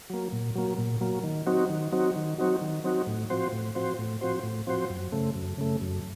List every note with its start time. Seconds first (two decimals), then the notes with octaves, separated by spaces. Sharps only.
0.10 F#3 A#3
0.32 A#2
0.55 F#3 A#3
0.78 A#2
1.01 F#3 A#3
1.24 D#3
1.47 F#3 C4 D#4 F#4
1.70 D#3
1.92 F#3 C4 D#4 F#4
2.16 D#3
2.38 F#3 C4 D#4 F#4
2.61 D#3
2.84 F#3 C4 D#4 F#4
3.07 A2
3.30 F3 C4 F#4 C5
3.52 A2
3.75 F3 C4 F#4 C5
3.99 A2
4.21 F3 C4 F#4 C5
4.43 A2
4.67 F3 C4 F#4 C5
4.90 F#2
5.12 C#3 A3
5.35 F#2
5.58 C#3 A3
5.81 F#2